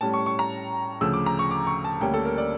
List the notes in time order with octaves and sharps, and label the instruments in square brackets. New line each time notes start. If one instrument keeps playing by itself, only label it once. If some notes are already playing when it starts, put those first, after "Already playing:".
[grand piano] A2 G3 C#4 A5
C#6
C#6
A#5
D2 C#3 F3 E6
D6
A#5
C#6
D6
C#6
A5
D2 D3 G3 A#3 C#4 G5
A4
A#4
D5